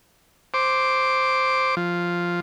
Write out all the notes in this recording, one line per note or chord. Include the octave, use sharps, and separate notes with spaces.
C5 D6
F3